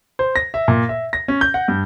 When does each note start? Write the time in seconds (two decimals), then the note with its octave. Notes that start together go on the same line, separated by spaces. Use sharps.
0.19 C5
0.36 A#6
0.54 E5
0.68 A#2
0.89 E5
1.13 A#6
1.28 C#4
1.41 G6
1.54 F#5
1.68 G2